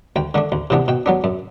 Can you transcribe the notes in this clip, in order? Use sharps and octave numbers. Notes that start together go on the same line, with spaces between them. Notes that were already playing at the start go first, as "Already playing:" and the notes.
D2 G5
D3 A3 D4
D2
C3 E3 B3 D4
B2 G5
F#3 B3 D4
F#2